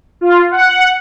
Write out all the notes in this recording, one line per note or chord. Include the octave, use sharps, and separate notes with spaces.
F4
F#5